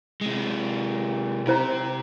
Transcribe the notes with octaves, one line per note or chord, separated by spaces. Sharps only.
C3 G#3
C3 E4 C5 A#5